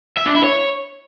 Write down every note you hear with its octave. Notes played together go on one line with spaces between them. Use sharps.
E5
D4
E4
C#5